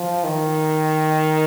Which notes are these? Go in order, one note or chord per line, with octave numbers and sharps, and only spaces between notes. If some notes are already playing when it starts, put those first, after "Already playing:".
Already playing: F3
D#3